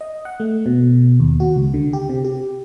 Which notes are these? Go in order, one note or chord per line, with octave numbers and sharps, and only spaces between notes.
D#5
F#5
A3
B2
D#2
F#4
C#2
D3
G4
C3
G4